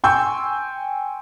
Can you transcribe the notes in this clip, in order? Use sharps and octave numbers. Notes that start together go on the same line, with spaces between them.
G5 G#5 C6 C#6 E6 G6